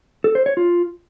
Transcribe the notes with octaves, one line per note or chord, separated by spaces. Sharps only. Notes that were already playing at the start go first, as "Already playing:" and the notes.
A4
C5
C#5
F4